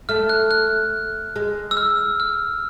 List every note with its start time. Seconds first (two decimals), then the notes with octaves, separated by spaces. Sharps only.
0.09 A3 F6
0.29 F#6
0.51 F#6
1.36 G#3
1.71 E6
1.77 F6
2.20 F6